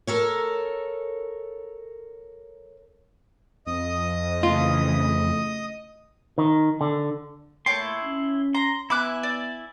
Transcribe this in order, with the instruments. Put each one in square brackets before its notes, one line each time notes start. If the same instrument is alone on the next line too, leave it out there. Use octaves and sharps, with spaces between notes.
[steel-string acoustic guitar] A4 A#4 C#5
[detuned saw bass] F2 [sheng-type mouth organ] D#5 D#6
[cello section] C#3 E3 A3 [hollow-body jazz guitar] F4
[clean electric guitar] D#3
D3
[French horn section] A#2 A3 A#3 [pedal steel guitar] E4 C6 [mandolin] C#5 G5 A5
[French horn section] C#4
[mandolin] A#5 [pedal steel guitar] C6
[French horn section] B3 [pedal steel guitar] E4 E5 G#5 [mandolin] B5 D6 F#6
[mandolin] D5